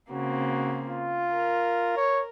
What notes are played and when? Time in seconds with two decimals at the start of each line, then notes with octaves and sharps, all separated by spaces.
0.11 C#3 A#3 C4 F#4
0.88 F4
1.33 A#4
1.97 C#5